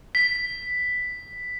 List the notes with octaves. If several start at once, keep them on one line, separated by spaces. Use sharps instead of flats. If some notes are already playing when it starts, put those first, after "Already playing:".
B6